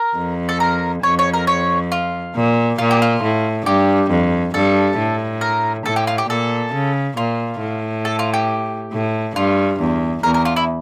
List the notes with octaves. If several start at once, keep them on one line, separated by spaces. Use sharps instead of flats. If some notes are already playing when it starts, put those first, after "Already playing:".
Already playing: A#4
F2
A4
A#4
F2 C#5
C#5
A#4
C#5
F4
A#2
A#2 F4
G4
F4
A2
G2 G4
F2
G2 A4
A2
A#4
A2 A4
G4
F4
G4
A#2 A4
C#3
A#2 F4
A2
A4
F4
G4
A2
G2 F4
E2
E2 A#4
A#4
F4
E4